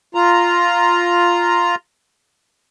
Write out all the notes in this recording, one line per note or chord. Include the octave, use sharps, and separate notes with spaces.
F4 A#5